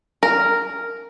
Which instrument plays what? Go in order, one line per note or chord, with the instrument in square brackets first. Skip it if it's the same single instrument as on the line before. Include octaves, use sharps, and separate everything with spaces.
[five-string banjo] A#4